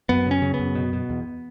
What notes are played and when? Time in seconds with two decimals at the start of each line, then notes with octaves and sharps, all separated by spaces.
0.09 F#2 B3
0.26 C#3 C#4
0.42 C#3
0.54 B3
0.59 F#2
0.75 B2
0.93 B2
1.10 E2